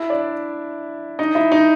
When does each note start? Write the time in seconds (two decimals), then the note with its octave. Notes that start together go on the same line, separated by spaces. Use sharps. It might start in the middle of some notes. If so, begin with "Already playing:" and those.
Already playing: E4 E5
0.10 D4 D5
1.19 D#4 D#5
1.35 E4 E5
1.52 D#4 D#5